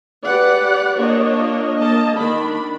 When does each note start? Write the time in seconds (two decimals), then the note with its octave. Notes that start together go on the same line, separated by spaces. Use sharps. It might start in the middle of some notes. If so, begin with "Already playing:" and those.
0.24 G4 B4 D5 F#5
0.99 A#3 D4 F4 C#5 D#5
1.77 A#3 D#5 A5
2.16 D#3 D4 B5